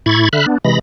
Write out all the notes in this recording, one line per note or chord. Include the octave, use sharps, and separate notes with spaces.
A2 E4 B5 C#6 G#6 A6
D3 E5 B5 F6 F#6
B3 D4
C3 E3 G#3 B5 A#6